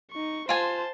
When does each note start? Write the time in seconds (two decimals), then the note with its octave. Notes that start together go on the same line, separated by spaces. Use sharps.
0.12 D#4 C#6
0.49 F4 C5 G#5 A5